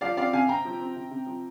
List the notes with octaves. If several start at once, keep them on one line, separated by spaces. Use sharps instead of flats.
F3 D5 F5
C4 D5 F5
C3 F5 G#5
C3 G5 A#5
F3
C4
C3
C3
F3